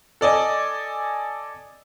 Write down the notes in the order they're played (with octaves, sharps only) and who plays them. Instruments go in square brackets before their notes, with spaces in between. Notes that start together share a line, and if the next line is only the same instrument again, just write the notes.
[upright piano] A4 D5 D#5 G#5